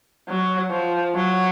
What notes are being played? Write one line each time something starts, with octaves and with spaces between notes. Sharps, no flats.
F#3
F3
F#3